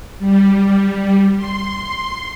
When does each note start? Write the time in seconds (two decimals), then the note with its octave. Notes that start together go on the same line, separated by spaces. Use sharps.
0.19 G3
1.36 C6